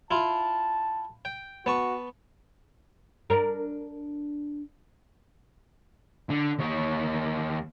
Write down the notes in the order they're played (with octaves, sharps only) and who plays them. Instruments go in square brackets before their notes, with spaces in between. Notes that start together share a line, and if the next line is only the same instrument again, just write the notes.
[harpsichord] E4 F4 [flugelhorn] A5
[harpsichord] G5
[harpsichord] B3 A5 C#6 [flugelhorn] F#4
[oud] D4 A#4
[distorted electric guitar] D3
D#2 C#5